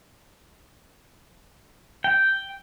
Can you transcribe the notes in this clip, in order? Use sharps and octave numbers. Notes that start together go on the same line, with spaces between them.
G5